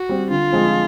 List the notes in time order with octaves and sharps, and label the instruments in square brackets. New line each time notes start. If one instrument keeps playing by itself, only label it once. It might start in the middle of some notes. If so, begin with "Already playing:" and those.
Already playing: [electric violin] F#4
[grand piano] G3 C4
[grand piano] D3 [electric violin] F4
[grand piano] F3 G#3 C4